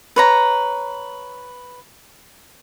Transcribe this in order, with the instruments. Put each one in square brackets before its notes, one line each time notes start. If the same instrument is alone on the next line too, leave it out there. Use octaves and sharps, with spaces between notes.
[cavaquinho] B4 C#5 A#5